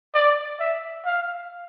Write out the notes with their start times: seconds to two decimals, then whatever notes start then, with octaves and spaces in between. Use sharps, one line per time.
0.14 D5
0.60 E5
1.05 F5